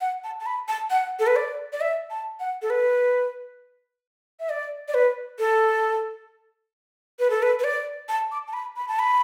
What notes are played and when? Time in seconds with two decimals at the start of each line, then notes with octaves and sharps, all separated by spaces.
0.01 F#5
0.24 A5
0.40 A5
0.46 B5
0.68 A5
0.90 F#5
1.19 A4
1.27 B4
1.36 D5
1.73 D5
1.81 E5
2.10 A5
2.40 F#5
2.62 A4
2.70 B4
4.40 E5
4.50 D5
4.88 D5
4.94 B4
5.39 A4
7.19 B4
7.30 A4
7.42 B4
7.59 B4
7.64 D5
8.09 A5
8.32 D6
8.48 A5
8.53 B5
8.76 B5
8.88 A5
8.99 B5